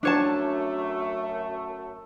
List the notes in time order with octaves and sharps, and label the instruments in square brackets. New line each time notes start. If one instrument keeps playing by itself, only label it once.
[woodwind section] F#2 A3 [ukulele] D4 C#5 A5